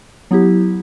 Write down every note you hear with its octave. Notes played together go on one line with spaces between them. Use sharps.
F#3 B3 E4 G4